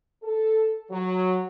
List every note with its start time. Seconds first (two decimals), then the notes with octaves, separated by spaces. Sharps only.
0.24 A4
0.90 F#3